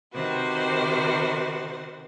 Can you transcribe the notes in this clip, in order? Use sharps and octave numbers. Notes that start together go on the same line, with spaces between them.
C3 D#3 F#4 B4 C5